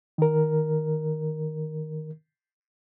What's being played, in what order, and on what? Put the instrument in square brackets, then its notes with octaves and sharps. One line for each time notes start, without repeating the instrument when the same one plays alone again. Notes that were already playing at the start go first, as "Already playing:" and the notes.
[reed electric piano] D#3 A#4